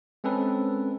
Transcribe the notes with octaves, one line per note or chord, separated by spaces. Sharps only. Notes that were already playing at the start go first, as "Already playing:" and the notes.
G#3 C4 C#4 A4 B4